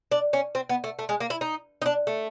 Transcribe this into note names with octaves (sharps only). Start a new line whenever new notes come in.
D4
C#4
C4
B3
A3
A3
G#3
A#3
E4
D#4
D#4
D4
A3